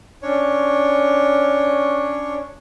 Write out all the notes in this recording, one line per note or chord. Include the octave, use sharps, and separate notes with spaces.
C#4 D4 C#5